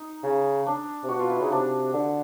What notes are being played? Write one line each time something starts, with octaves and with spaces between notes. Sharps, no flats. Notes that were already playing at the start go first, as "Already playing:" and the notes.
Already playing: D#4
C#3
D4
C3
B2 F#4
F4
E4
C#3 D#4
C3 D4
D3